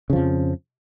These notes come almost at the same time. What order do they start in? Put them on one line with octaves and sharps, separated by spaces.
C#3 F3 F2